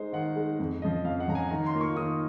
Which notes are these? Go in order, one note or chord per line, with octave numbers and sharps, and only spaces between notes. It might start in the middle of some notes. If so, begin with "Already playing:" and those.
Already playing: G#3 D#4 C5
D#3 F#5
G#3 D#4
F2
C#3 F3 D#5
F2 F5
F#5
C#3 F3 A#5
G#5
D#3 A#5
C6
A#3 F4
C#6
D#3 D#6